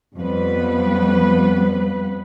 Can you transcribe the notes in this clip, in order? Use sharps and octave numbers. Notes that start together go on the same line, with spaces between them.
F2 G3 B3 B4